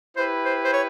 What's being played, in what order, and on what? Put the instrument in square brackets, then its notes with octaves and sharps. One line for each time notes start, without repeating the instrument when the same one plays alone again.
[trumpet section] E4 G4 B4 [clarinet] C5
[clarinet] C5
C5
C#5